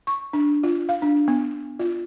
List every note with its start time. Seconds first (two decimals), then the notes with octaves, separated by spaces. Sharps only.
0.07 C#6
0.33 D4
0.64 F4
0.89 F5
1.02 D4
1.28 B3
1.79 F4